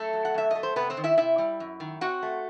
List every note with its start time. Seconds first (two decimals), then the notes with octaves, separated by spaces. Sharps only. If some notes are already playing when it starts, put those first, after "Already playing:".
Already playing: F#2 A3 A4
0.13 F#3
0.25 F#5
0.34 F#2 E5
0.51 A3 D#5
0.63 C5
0.76 C3 B3 B4
0.90 C4 C5
0.97 D#3
1.04 E4 E5
1.18 C3 E4 E5
1.38 G3
1.60 F#2
1.80 D#3
2.01 C4 F#4 F#5
2.22 A3